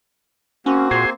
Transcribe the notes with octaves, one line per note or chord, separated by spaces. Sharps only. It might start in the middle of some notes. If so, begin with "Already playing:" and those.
A#3 C4 C#4 F#4
A#2 G#4 C5